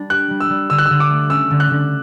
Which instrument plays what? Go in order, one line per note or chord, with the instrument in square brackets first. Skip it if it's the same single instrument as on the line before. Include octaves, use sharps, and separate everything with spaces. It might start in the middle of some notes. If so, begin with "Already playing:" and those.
Already playing: [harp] G3 D4
[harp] G4 [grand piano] F#6
[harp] G3
[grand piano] E6
[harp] G3
[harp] D3 [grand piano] E6
[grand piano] F#6
[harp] D3 [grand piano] E6
[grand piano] D6
[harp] A3
[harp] C#4 [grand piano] E6
[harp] D3
[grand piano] F#6
[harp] D3